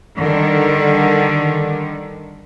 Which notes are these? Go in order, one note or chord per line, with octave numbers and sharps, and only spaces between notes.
D3 D#3 G3